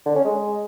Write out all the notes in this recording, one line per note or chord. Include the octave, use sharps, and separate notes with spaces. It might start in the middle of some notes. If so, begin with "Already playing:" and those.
D3
C#4
G#3